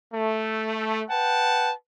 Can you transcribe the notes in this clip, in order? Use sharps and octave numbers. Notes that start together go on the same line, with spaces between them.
A3
B4 F#5 G5 A5